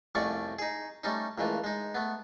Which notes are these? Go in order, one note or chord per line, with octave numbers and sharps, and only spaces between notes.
C2 F2 A3 C#4 D5 C#6
D#4 G#4
G3 A3 C#4 D#4
C#2 A#2 E3 A3
G#3 D#4
A3 B3